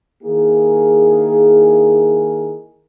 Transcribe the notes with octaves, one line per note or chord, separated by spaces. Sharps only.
D#3 A#3 E4 G#4